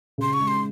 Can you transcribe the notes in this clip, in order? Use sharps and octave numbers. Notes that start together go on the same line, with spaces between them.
C#3 C6
C#6
G#3
C6